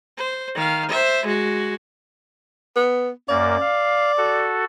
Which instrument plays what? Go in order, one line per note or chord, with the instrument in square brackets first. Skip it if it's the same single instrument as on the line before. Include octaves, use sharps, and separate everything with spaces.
[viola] C5
D#3 F5
C5 E5
G#3 F#4
[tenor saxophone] B3
[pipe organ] F#2 A#3 [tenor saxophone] D5
[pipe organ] F5
F#4 A4